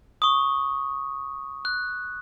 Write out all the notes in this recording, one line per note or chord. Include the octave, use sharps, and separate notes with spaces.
C#6 D#6
F#6